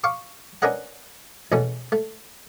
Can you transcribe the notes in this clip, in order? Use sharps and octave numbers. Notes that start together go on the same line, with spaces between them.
F5 C#6 D6
C#4 D4 A#4 B4 D#5 F#5
E2 B2 A3 C#4
A3